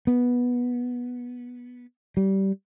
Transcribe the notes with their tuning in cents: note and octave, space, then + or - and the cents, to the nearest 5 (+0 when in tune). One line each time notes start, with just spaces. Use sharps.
B3 -10
G3 -20